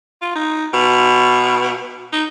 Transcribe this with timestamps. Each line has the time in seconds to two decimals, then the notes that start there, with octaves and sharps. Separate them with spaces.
0.22 F4
0.36 D#4
0.74 B2
2.13 D#4